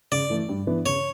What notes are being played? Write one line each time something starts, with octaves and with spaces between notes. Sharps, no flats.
C#3 D5
E3 A3
G2
E3 B3 D4
C#3 C#5